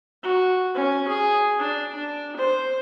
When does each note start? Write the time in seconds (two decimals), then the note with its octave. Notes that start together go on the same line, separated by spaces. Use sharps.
0.23 F#4
0.75 C#4
1.08 G#4
1.59 D4
1.94 D4
2.36 C5